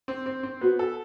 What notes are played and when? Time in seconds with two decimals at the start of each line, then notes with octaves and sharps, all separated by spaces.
0.08 C4
0.26 C4
0.43 C4
0.61 B3 F#4
0.79 A4